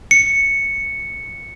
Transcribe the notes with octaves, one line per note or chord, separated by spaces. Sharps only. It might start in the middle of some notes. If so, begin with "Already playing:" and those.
C#7